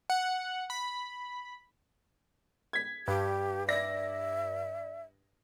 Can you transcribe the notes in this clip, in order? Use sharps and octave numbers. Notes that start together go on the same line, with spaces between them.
F#5
B5
G#6 B6
G2 G4
D5 E5 A#6